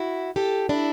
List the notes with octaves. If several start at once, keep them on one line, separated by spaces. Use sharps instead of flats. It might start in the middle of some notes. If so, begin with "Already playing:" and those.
Already playing: E4 F#4
G4 A4
D4 E4